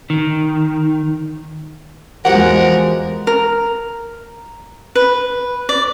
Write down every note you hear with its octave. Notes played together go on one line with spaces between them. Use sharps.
D#3
E2 F3 G#3 F#4 G4 A#4 F#5
A#4
B4
D5